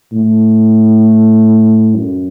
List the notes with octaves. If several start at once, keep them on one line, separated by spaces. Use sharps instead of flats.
A2
F#2